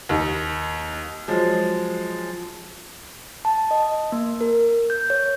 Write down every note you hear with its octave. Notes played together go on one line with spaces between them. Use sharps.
D#2
F3 F#3 G#3
A5
D#5
A#3
A#4
G6
C#5